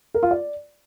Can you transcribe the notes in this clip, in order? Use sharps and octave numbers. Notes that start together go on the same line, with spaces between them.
A#4
F4
D5